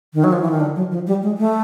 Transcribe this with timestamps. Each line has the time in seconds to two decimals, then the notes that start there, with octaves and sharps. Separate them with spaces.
0.14 D#3
0.24 F#3
0.33 F3
0.42 E3
0.51 D#3
0.60 D3
0.76 F#3
0.91 F3
1.07 G3
1.22 G#3
1.38 A3